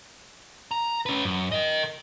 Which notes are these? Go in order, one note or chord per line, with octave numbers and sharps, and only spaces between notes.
A#5
C#4 B4
F#2
A#4 D#5